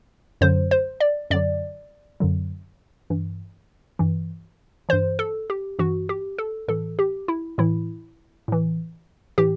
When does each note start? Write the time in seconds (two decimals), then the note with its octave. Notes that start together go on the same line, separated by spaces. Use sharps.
0.41 F#2 D3 F#3 C5
0.71 C5
1.00 D5
1.31 F#2 D3 F#3 D5
2.20 F#2 D3 F#3
3.10 G2 E3
3.99 G2 E3
4.89 G2 E3 C5
5.19 A4
5.50 G4
5.79 G2 E3 F#4
6.09 G4
6.38 A4
6.68 A2 E3 A4
6.99 G4
7.28 E4
7.58 A2 E3 E4
8.48 A2 E3
9.38 A2 E3 G4